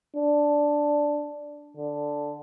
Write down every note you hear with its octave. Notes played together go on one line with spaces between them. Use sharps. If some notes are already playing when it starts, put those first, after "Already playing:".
D4
D3